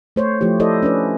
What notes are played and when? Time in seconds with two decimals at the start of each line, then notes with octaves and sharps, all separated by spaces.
0.16 A3 C5 C#5
0.41 F3 A3 E4 G4
0.60 E4 G4 A4 C5 D5 D#5
0.83 C#4 D4 B4